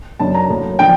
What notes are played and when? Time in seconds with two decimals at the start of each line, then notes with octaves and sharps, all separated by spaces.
0.19 F#2 D3 F#3 A5
0.35 A#5
0.49 A2 F#3 A#3
0.79 D3 F3 G5